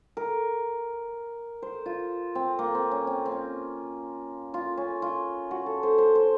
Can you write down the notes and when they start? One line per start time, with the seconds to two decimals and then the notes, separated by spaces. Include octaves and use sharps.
0.17 A#4
1.62 C5
1.86 F4
2.35 C4
2.59 A#3
2.75 C4
2.91 C#4
3.07 C4
3.26 C4
3.32 C#4
4.54 F4
4.77 C#4
5.02 F4
5.51 F#4
5.66 A4
5.83 C5
5.98 C5
6.15 C5